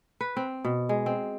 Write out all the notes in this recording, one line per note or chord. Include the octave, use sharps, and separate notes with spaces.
B4
C4
B2
G#3
C4